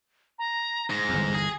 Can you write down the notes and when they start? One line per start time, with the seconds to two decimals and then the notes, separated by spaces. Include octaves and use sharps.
0.39 A#5
0.90 G#2 A#6
1.09 G1 E2
1.34 G#4